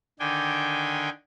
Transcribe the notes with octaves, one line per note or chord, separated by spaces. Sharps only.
D3 D#3 D4 G5 G#5